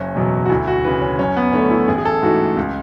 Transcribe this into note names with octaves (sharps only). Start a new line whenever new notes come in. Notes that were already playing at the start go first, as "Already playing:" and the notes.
Already playing: F#1 C#4
E2 B2 F#3
F#4
D2 E4
F#4
C#3 E3 B4
C#4
F#2 C#4
B3
D3 A3 C#4
E4
A1 G#4
G#4
A4
G#2 E3 A3 F#4
C#2